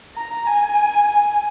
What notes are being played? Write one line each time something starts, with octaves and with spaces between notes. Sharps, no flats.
A#5
G#5